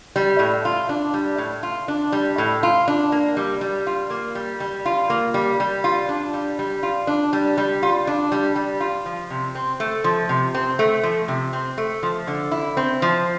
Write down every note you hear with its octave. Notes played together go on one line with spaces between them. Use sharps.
G3
A2
F4
D4
G3
A2
F4
D4
G3
A2
F4
D4
A#3
G3
G3
F4
A#3
G3
G3
F4
A#3
G3
G3
F4
D4
G3
G3
F4
D4
G3
G3
F4
D4
G3
G3
F4
F3
C3
C4
A3
F3
C3
C4
A3
F3
C3
C4
A3
F3
D3
E4
C4
F3